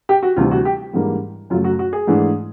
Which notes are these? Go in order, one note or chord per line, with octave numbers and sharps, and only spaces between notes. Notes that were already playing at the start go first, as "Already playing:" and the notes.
G4
F#4
D2 C3 E3 G3 F4
F#4
G4
G#2 E3 G3 A#3 D4
F#2 C#3 F#3 A3 F4
F#4
F#4
G#4
G#2 E3 A3 D4